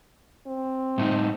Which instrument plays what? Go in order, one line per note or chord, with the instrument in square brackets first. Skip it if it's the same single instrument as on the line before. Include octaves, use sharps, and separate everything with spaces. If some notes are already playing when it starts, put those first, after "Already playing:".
[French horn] C4
[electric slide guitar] A2 A3 D#4